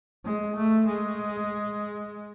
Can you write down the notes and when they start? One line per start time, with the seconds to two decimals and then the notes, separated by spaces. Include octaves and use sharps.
0.25 G#3
0.56 A3
0.87 G#3